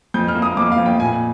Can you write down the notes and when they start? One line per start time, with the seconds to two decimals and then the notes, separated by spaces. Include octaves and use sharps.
0.14 F2 G6
0.28 F6
0.35 A#3
0.42 D#6
0.57 F2 D6
0.72 F5
0.78 F2
0.86 G5
1.00 A#2 G#5